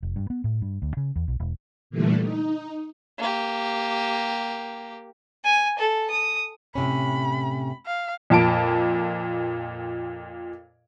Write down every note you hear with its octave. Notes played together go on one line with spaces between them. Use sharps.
F1
G2
B3
A2
G2
D2
C#3
E2
B1
E1
A#2 D3 E3 G3 A3
D#4
A#3 G4
G#5
A4
D#6
A2 C3 C#4 B5
F5
F2 A#2 A5 D7